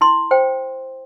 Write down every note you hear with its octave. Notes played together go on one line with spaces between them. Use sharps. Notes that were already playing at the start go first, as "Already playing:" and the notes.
E4 C6
C5 G5